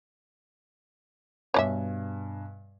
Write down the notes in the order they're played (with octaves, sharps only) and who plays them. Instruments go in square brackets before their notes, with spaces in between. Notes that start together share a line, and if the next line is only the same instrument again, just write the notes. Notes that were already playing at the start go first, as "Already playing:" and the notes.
[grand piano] G2 B2 G#5 [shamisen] C#5 D5 E5